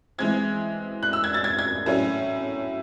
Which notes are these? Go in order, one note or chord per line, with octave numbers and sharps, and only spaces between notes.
E3 G#3 C4 G#6
F#6
E6
G#6
A6
G#6
G#6
A2 F#3 C#4